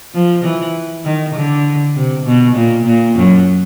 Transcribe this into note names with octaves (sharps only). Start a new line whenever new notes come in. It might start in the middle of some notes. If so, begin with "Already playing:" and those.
F3
E3
D#3
D3
C3
B2
A#2
A#2
F#2